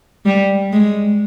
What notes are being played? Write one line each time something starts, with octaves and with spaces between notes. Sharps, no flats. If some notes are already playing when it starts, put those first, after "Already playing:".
G3
G#3